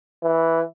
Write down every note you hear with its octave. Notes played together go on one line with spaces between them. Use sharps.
E3